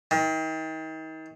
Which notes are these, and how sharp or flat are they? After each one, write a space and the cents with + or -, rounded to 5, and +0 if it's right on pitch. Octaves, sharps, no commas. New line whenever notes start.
D#3 +35